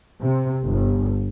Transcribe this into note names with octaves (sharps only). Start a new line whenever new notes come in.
C3
G1